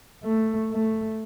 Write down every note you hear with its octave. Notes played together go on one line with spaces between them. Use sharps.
A3
A3